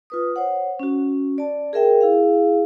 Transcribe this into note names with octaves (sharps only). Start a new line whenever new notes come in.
F4 B4 D#6
C5 C#5 F#5
C#4 F#4
D5 A5
G#4 A#4 E5 G5
E4 G#4 F5